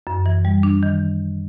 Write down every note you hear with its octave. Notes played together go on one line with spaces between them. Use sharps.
F#2
E3
G3
D4
D#3